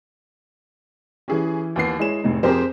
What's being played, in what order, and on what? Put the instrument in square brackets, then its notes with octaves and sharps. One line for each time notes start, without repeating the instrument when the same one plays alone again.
[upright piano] E3 E4 G4 [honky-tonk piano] C#4 G#4
[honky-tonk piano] D#2 B3 C7
[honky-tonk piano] G#3 E7 [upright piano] E4 G#4 C#5
[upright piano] F1 A2 D#4
[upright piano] F2 C4 G#4 [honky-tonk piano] G4 A#4 C5